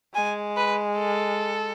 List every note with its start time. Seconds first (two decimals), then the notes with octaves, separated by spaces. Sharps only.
0.14 G#3 G#5
0.57 B4
0.98 A4